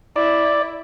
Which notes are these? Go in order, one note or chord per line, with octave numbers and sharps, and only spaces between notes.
E4 D5